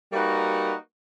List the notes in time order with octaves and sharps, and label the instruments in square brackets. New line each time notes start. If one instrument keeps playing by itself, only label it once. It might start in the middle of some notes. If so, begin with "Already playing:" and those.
[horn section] G3 A#3 D#4 F#4 B4